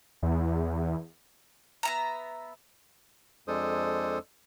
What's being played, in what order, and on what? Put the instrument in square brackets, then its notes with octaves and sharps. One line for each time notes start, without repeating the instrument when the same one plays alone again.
[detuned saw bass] E2
[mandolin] B3 E5 A#5
[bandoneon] F2 G#3 D4 A4 C5 D#6